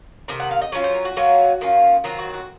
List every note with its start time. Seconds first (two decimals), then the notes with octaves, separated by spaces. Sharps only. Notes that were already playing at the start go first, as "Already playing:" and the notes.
0.28 C3 D#3
0.40 F#5
0.51 F5
0.61 D#5
0.72 F#3 C#4 F4 C#5
0.84 C5
0.94 A#4
1.05 F#4
1.17 F#3 A#3 C#4 F4
1.61 D#3 A#3 C#4 F4
2.04 D#3 F#3 C4 F4
2.19 F#4
2.34 F#4